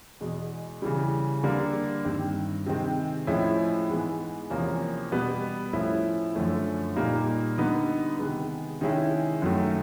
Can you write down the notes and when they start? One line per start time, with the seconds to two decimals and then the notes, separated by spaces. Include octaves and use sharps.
0.21 E2 B2 G#3
0.82 C#3 E3 G3
1.43 D3 G3 A#3 D4
2.05 G2 D#3 G3 C4
2.66 C3 D#3 G#3 C4
3.27 A2 F3 G#3 C#4 E4
3.89 G#2 E3 G#3 B3
4.50 E2 C3 F3 A#3 C#4
5.12 B2 G3 B3
5.73 A2 F3 A3 C#4 E4
6.35 F#2 D3 F3 A3 C#4
6.96 A#2 G3 A#3 D#4
7.58 D3 G3 B3 D#4
8.19 C3 D#3 G#3 B3
8.81 C3 D#3 G#3 C#4 E4
9.42 F#2 D#3 F#3 A3